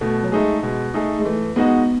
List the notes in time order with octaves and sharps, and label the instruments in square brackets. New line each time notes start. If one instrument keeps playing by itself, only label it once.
[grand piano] B2 [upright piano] A3
[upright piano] F#3
[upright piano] G#3 [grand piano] A3 D#4 G#4
[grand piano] B2 [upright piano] G#3
[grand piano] A3 D#4 G#4
[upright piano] G#3
[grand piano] E3 [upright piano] A3
[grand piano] G#3 D#4 F#4 [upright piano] B3